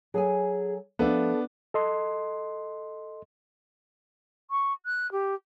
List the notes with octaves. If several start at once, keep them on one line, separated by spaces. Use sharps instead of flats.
F#3 G#4 A4 G#5
F3 A3 B3 D4 A4
A4 D#5 C6
C#6
F#6
G4